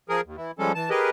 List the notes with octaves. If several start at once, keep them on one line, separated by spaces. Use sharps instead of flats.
F3 G#4 A#4
D#2
E3 E4
F3 G3 G#3 C#4 A4
E3 A5
G4 G#4 A#4 B4 D#5